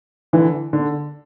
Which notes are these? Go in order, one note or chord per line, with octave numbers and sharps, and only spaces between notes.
D3 E3
D3